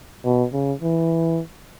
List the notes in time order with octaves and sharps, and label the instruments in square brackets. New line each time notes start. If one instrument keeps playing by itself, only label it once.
[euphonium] B2
C#3
E3